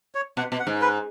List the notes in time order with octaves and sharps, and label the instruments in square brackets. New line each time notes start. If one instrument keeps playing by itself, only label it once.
[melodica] C#5
[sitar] B2 [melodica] F#5
[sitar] B2
[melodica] F#5
[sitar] G#2
[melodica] B4